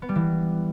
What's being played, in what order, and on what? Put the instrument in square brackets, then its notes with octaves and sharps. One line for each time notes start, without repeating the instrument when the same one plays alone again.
[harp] B3
G3
E3